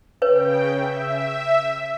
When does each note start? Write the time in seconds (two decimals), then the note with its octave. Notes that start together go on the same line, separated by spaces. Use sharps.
0.22 C#3 B4 C#5 G5
0.72 E5